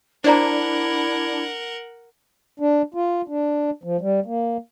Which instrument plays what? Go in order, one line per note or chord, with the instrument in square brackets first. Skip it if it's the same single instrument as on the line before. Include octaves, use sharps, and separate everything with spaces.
[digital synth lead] D4 [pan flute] E4 [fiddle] A#4 F#5 [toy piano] C5 D5 A#5
[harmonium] D4
F4
D4
F3
G3
A#3